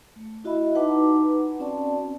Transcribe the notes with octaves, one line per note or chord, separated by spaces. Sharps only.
A3
E4 F#4 D#5 E5 B5
D#4 B4 F#5 A5 A#5 D6
C4 C#4 F#4 D5 G5 A5